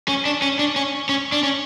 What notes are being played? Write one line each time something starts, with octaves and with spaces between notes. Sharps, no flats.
C#4
D4
C#4
D4
C#4
C#4
D4
C#4